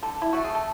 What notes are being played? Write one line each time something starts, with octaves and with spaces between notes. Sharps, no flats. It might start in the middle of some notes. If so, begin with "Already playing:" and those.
D3 A4
E4
A3 F#4
G#4
A4